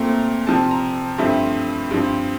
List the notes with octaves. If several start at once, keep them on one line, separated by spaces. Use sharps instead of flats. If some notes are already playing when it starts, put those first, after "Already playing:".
Already playing: A#2 A3 C4 A#5
C3 F3 C4 A5
A#5
G2 F3 A3 C4 E5
G2 F3 C4